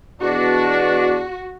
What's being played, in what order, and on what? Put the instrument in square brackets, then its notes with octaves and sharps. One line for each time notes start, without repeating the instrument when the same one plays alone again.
[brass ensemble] E2 B2 D4 [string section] F#4